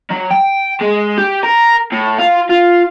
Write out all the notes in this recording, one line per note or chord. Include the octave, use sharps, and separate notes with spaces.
F#3
G5
G#3
G4
A#4
A2
F4
F4